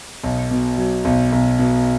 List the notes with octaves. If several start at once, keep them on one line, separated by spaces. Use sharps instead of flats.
B1
B2
F#3
B1
B1
B2